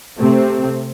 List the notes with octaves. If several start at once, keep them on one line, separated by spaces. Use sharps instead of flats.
C3 A3 C4